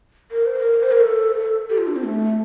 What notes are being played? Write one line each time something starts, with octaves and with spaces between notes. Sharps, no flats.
A#4
C5
A#4
C5
A#4
A4
G4
F4
D4
C4
A3